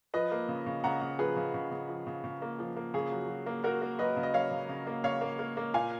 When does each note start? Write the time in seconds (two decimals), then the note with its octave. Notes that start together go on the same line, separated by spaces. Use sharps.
0.14 F3 B4 D#5
0.31 A#3
0.48 C#3
0.66 C#3
0.84 C#3 F#5 A#5
1.02 C#3
1.19 F3 G#4 B4
1.36 C#3
1.54 C#3
1.72 C#3
1.89 F3
2.07 C#3
2.24 C#3
2.42 A#3
2.59 F3
2.77 A#3
2.94 C#3 G#4
3.12 F#3
3.28 F#3
3.46 A#3
3.64 A#3 F#4 A#4
3.82 A#3
3.99 F#3 B4 D#5
4.16 C#3
4.23 D#5
4.34 F#3 C#5 F5
4.51 C#3
4.69 C#3
4.87 A#3
5.04 C#3 C#5 F5
5.21 A#3
5.39 A#3
5.57 A#3
5.74 A#2 F5 G#5